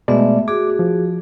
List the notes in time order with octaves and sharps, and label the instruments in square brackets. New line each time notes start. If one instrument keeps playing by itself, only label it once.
[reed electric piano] B2 G#3 D5 [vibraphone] A3 B3 E5
[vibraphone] F#4 G#4 [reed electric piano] D6
[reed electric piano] F3